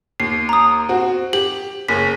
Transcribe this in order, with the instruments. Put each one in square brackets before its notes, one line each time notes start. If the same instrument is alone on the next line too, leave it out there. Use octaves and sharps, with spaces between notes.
[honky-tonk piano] D#2 [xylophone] C7
[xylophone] A#5 D#6
[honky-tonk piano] C4 F#4
[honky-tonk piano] G4 [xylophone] F#7
[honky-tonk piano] F#1 G#4 C#5 [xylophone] B6